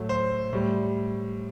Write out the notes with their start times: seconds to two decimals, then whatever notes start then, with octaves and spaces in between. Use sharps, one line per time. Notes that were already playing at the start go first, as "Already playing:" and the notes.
Already playing: A2 F#3 A3 A4
0.09 C5
0.53 A2 G3